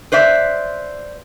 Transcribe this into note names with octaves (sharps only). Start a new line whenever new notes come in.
B4 C5 D5 E5